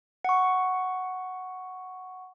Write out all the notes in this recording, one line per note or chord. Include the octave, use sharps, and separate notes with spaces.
F#5 C#6